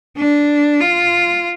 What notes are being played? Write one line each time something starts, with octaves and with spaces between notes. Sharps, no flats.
D4
F4